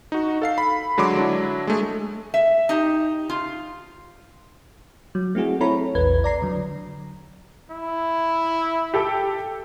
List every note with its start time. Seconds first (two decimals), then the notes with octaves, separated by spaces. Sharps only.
0.12 D#4 F#4
0.42 A4 F5 C7
0.58 B5
0.98 D3 F#3 G#3 C6 D6
1.17 F#3 D4 E4
1.67 G#3 A3 G#4
2.34 E5
2.69 D#4 G4
3.30 F4
5.15 F#3
5.35 A3 C4 E4 F#4 G#4
5.61 C4 E4 A4 C#5 A#5 B5
5.95 A#1 E2 B4 G#6
6.24 D5 A#5 C7
6.42 D3 F#3
7.70 E4
8.94 G4 A4 G5